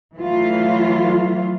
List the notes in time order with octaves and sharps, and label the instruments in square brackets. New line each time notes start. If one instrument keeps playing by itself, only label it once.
[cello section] E3 F#3 A3 F4